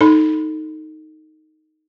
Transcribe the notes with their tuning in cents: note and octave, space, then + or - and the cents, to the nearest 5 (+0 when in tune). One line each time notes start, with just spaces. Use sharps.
D#4 +0 A4 +0 B5 +0